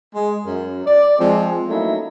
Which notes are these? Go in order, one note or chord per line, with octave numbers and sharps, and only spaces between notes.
G#3
F#2
D5
F3 G#3 C4
F#3 A3 A#3 C#4 D#4 E4